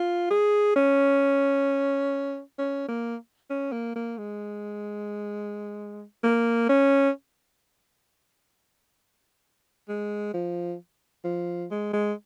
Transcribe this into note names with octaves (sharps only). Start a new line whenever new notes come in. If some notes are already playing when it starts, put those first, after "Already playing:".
Already playing: F4
G#4
C#4
C#4
A#3
C#4
A#3
A#3
G#3
A#3
C#4
G#3
F3
F3
G#3
G#3